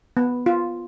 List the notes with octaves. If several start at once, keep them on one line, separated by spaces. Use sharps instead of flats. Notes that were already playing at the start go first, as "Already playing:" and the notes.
B3
F4